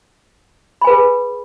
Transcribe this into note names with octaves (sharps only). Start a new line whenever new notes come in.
G#4 B4 G#5 B5